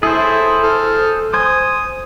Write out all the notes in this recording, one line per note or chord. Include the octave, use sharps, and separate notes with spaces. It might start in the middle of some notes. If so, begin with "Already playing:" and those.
E4 G#4 A4 C5
A4 F6
C5 G#5 D#6